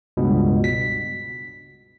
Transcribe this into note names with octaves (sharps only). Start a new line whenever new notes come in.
C#2 G2 B2
B6